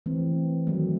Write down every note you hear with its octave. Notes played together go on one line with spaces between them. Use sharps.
E3 A3 C4
D#3 F#3 A3